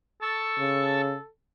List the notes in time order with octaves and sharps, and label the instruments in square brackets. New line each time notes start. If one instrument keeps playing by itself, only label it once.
[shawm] A4 [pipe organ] A5 C#6 E6
[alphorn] C#3